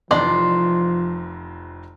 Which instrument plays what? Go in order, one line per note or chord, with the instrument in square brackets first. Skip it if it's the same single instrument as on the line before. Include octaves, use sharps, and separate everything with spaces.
[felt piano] F1 F2 E3 [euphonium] F3 [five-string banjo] D4 D5 D#5 [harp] C6